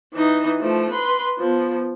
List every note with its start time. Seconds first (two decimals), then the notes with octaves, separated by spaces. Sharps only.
0.14 E3 D#4
0.60 F3 A3
0.90 B4 C6
1.39 F3 B3